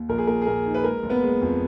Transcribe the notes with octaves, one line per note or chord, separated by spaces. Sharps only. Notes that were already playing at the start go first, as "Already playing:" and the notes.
Already playing: D#2
A#1 A#4
G#4
A#2 A#4
G#4
A#2 A#4
D#4
B4
G#3 A#4
F#1
B3 B4
G#3
F2